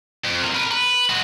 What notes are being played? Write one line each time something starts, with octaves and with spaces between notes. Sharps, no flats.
F2
C3 A#4
A#4 B4
B4
G#3 F#4